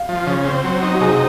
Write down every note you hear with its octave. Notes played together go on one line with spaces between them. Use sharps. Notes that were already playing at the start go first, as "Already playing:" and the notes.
Already playing: F5
F3
C#3
C4
F#3
D#4
F#4
C3 G#4